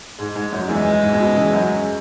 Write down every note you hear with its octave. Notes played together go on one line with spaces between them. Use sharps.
G#2 G#3
G#2 G#3
F#2 F#3
E2 E3 G#3
G#2
B2
C#3
E2 E3
F#2 F#3